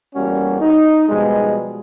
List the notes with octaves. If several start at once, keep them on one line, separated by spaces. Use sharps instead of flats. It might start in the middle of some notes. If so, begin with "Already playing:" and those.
E2 G3 A#3 C#4 F#4
D#4
B2 F3 G3 G#3